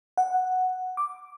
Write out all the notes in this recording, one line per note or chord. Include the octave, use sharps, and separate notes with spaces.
F#5
D6